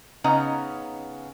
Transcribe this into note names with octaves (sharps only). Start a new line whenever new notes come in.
C#3 B3 C#4 D#4 D#5 A#5